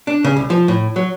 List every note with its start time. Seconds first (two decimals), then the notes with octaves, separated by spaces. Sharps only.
0.07 D4
0.24 C#3
0.37 C2
0.50 F3
0.68 A2
0.96 F#3